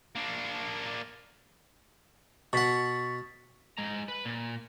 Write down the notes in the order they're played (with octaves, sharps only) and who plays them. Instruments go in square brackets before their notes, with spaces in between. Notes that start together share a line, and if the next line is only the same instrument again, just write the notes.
[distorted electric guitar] A#3 D4
[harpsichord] B2 F#5 [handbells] C#6 A6 B6
[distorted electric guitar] G#3 A#5
B4
A#2